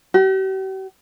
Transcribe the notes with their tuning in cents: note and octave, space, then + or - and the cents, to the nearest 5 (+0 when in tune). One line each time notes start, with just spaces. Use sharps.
G4 -45